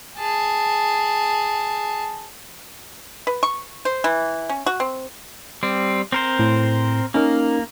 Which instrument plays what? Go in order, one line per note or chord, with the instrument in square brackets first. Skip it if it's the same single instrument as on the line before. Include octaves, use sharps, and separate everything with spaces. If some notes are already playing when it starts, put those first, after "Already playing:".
[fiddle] G#4 A5
[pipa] B4
C#6
C5
E3
C#4
F#4
C4
[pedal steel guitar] G3 C4
C4 A#4 C5
[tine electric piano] A2
[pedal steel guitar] A#3 [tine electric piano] C#4 D#4 A#4